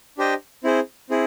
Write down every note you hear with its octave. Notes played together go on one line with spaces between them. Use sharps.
D4 G4 C5 D#5 G5
C4 E4 G#4 C5
C4 E4 G#4